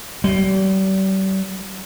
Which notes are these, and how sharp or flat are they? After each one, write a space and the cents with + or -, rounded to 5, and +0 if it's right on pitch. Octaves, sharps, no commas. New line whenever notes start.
G3 -40